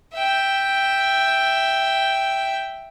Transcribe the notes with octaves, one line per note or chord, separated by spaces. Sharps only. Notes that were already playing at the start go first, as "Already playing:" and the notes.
E5 G5